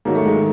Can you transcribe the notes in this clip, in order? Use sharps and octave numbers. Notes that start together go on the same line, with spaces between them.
G#2 D#3 F#3 A#3
A3
G#3
D#3